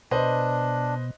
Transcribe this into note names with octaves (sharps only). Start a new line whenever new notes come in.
B2 D4 B4 C5 D#5